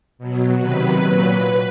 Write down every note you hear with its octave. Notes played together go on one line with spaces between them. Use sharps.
B2 F#3
C3 D#3 F#3 B4
A#2 F#3